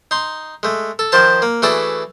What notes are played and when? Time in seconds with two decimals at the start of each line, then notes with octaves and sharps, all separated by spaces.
0.11 D#4 C6
0.63 G#3 A3
0.99 A4
1.12 D#3 F3 C5 A5
1.42 A#3
1.62 E3 A3 F#4 G#4 A4 D5